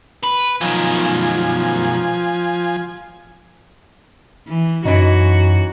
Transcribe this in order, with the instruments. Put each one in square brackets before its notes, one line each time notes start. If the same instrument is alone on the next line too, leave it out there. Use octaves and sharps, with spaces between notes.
[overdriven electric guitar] B4
[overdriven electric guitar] B1 D#3 [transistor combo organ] F3 G#5
[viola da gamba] E3
[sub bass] F#2 [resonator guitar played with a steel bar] E3 C#4 D#4 [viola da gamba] F#4